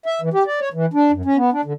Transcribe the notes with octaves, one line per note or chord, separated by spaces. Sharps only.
E5
E3
G4
D5
C#5
E3
D4
F#2
C#4
B3
D4
D3